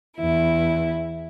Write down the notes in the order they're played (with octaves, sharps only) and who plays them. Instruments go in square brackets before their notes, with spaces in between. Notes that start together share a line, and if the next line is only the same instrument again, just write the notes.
[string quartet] E2 E4